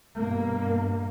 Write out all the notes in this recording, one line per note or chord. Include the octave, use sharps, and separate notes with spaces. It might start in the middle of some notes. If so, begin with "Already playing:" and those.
G2 B2 A#3